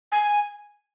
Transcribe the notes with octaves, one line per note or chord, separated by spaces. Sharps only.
G#5